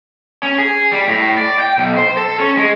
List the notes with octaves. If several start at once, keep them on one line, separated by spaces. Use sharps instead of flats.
C#4
G#4
G3
A2
D5
G5
B1
C5
A4
C#4
G#3